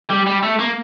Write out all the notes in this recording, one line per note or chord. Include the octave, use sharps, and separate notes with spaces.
G3
G3
A3
A#3